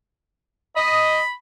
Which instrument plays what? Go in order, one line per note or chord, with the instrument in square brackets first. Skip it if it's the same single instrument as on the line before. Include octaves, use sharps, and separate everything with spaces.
[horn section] D#5 [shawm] B5